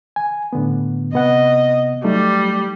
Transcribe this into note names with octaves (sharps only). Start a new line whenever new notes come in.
G#5
A2 D3 B3
C3 B3 D#5 F#5
F#3 G3 A3 D#4